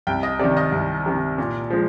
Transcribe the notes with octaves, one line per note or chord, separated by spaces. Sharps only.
C2 G5
D#5
C3 D#3 D5
D#5
C2
C3 D#3
A#2
F3 G#3